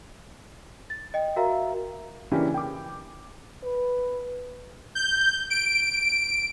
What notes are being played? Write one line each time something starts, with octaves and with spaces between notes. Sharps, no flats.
A6
D#5 G5
F#4 A#4 E5 F5 A#5
C#3 E3 A#3 C#4 D4 G4
G5 D6
B4
G6
D7